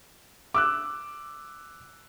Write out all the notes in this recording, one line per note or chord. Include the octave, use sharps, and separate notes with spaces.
D6 E6 F#6